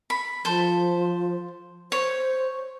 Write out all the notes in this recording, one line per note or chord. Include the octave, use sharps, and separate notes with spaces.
B5
F3 A4 C5
C5 C#5